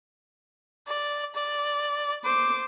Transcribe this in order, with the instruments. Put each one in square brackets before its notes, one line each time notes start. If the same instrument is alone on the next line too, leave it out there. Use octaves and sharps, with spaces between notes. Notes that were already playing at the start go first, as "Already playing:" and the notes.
[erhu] D5
D5
[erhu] C5 [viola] D6